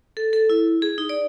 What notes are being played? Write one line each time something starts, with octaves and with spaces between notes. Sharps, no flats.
A4
A4
E4
G#4
D#4
D5